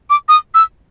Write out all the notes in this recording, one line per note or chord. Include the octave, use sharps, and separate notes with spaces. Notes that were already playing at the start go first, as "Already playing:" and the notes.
D6
D#6
E6